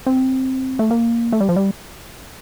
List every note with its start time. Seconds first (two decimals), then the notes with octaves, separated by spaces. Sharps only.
0.06 C4
0.79 A3
0.91 A#3
1.32 A3
1.40 G3
1.49 F3
1.56 G3